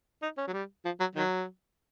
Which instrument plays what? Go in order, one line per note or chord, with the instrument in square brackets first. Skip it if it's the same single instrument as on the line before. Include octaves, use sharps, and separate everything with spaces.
[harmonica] D#4
C#4
F#3
G3
F3
F#3
D#3 F#3